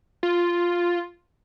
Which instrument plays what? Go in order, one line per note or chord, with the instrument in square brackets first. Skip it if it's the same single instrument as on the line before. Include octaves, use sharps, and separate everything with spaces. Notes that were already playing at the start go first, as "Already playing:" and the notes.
[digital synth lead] F4